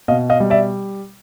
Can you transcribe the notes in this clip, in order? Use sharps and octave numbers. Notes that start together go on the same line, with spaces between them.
B2 D#5 F5
D#5 F5
G3
D5 E5